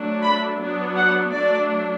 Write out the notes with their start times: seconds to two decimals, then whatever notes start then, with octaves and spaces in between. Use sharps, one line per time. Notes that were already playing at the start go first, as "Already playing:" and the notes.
Already playing: F#3 A3 D4
0.22 B5
0.59 F#3 B3 D4
0.96 F#5
1.32 F#3 A3 D4 D5